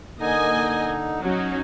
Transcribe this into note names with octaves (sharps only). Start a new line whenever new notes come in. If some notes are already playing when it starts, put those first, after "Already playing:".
D3 A#3 D#4 D#5 G#5
F#3 C#4 D#4